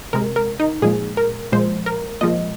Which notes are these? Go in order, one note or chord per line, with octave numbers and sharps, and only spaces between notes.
C3 G#3 A#4
A#4
D#4
A#2 F3 G#3 G#4
A#4
A#2 F3 G#3 C5
A#4
A#2 F3 G#3 D#5